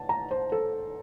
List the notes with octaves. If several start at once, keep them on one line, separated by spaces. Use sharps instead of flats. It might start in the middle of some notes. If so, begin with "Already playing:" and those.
Already playing: A5
A#5
C5
A4